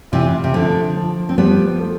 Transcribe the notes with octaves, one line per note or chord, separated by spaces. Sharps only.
C3 E3 F4
C3
D3 F3
F3
C4
F3 G3 B3
A3